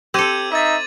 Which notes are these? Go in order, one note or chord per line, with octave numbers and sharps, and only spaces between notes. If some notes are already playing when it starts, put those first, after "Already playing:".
C4 G4 A4 E6 G#6 D#7
D#4 E5 D6 A6